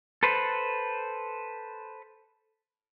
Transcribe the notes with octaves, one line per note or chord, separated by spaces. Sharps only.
A4 B4 C5